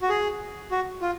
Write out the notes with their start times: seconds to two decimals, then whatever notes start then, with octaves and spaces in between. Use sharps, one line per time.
0.02 F#4
0.09 G#4
0.71 F#4
1.02 F4